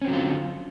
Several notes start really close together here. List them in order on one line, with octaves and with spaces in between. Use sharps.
C#4 C4 F#3 D3 F4